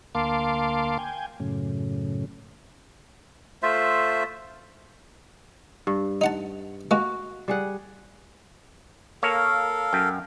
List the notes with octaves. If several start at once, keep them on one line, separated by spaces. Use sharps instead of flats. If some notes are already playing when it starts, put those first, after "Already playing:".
D2 A#3 F5 A5 C6 D6
G5 G#5
F#2 A2 C#3
A3 F4 C5 E5
G2
D#4 F#5 A5
G#3 A#3 F#4
G3 G#4 F#5
A#3 A4 A#4 C#5 F5
F#2 G5